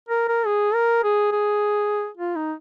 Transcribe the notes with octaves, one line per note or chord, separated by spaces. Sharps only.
A#4
A#4
G#4
A#4
G#4
G#4
F4
D#4